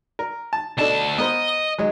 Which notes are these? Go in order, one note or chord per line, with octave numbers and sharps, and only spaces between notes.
A#4
A5
D2 B2 D4 A4 A5
B3 A#4 C5 D#5
F#3 G#3